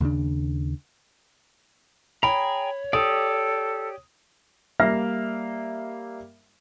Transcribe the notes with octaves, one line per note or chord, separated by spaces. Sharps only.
D#2 C#3 A3 D4
G#4 C#5 G5 A#5 B5
G4 A4 D5 D#6
G3 A#3 E5 F5 F6 A#6